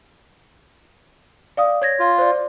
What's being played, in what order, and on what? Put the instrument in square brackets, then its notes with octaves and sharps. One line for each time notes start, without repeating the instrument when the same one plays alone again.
[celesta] D5 F5 D#6
C#5 G#6 A#6
[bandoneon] F4
[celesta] C5 D5